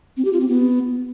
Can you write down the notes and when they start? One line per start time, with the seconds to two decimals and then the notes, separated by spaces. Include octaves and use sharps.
0.17 C4
0.25 G4
0.33 F4
0.40 C4
0.48 B3